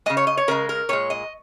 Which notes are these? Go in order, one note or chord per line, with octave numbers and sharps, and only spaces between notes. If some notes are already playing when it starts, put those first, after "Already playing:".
C#3 G#3 D#5
C#5
D#5
C#5
C#3 G#3 A#4
A#4
A#2 G#3 C#5
D#5